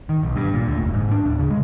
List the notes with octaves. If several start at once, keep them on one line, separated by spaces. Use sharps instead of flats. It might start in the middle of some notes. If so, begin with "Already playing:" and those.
D#3
B1
G2
A#2
D2
F1
G#2
D4
D1
C#3
G#3